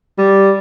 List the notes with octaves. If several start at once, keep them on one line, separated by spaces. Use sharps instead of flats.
G3